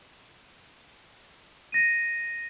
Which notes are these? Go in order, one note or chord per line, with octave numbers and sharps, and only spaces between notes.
A#6 D#7